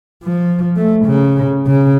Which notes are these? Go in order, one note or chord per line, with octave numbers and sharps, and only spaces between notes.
F3
A3
C#3
C#3